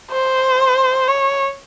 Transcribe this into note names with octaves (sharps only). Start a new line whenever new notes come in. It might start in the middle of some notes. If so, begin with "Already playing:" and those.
C5
C#5